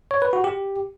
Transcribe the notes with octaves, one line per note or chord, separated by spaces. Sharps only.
C#5
B4
F#4
G4